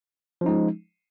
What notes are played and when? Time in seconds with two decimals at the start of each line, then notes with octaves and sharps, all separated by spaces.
0.41 F3
0.44 C#4
0.46 D#4
0.49 G#3